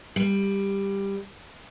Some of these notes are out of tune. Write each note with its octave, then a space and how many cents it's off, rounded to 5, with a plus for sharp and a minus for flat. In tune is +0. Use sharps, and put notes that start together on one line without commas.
G3 +10